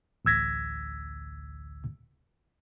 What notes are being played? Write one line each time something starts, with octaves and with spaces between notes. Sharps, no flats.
A1 D2 E6 G#6 A#6 B6